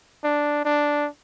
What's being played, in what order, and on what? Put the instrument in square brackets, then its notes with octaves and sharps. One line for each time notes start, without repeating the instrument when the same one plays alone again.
[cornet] D4
D4